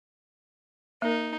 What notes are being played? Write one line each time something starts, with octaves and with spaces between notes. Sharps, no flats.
A#3 D#4 A#4